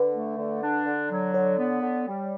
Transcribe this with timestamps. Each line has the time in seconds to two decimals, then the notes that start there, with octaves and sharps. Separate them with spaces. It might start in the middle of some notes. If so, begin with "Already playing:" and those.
Already playing: D3 B4
0.13 A3
0.37 D3
0.61 D4
0.85 D3
1.10 F#3
1.34 D3 C#5
1.58 B3
1.82 D3
2.07 G3